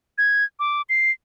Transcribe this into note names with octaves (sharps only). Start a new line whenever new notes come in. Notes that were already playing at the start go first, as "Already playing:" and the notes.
G#6
D6
C7